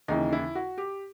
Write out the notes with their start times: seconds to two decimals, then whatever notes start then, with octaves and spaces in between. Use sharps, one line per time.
0.08 D#2 C#3 E3 D#4
0.32 E4
0.55 F#4
0.78 G4